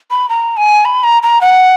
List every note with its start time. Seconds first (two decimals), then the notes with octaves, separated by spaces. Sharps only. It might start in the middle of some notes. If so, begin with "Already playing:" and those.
0.11 B5
0.29 A#5
0.57 G#5
0.85 B5
1.03 A#5
1.23 A#5
1.41 F#5